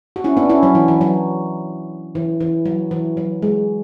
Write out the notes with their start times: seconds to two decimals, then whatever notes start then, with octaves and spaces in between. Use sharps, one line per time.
0.16 F#4
0.24 C#4 E4
0.37 B3 D4
0.49 C#4 E4
0.63 F#3
0.75 E3
0.88 E3
1.01 F#3
2.15 E3
2.41 E3
2.66 F#3
2.91 E3
3.17 F#3
3.42 G#3